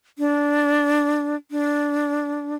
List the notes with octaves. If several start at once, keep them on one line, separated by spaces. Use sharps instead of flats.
D4
D4